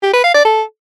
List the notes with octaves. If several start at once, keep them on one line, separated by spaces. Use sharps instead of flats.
G4
B4
F5
D5
A4